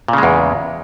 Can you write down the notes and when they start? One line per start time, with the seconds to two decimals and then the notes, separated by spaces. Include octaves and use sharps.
0.08 A#2
0.13 C#3
0.18 G#3
0.23 E2